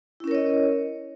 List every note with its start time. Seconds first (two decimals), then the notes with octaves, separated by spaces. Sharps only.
0.20 E4
0.24 C#4
0.27 A#4
0.31 C#5
0.35 D#5